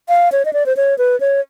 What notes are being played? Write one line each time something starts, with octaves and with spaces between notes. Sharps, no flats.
F5
C#5
D#5
D5
C5
C#5
B4
C#5